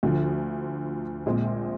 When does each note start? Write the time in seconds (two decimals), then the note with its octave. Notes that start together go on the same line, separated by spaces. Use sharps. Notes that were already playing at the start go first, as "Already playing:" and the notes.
0.03 D2 D3 F3
1.26 A#1 A#2 G#3 C4